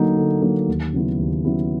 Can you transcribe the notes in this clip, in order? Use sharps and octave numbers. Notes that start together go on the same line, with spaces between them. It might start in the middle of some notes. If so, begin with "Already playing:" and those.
Already playing: D3 F#3 A#3 D#4
D3
F#3 A#3 D#4
D#2
C#3 F#3 B3 E4
D#2
C#3 F#3 B3 E4